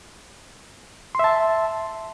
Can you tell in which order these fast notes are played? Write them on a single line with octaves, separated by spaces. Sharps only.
C6 E5 A5